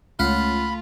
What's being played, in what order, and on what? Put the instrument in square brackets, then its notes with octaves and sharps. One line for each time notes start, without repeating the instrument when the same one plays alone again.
[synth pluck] C#2 [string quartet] A3 F4 [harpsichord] F5 F#5 [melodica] B5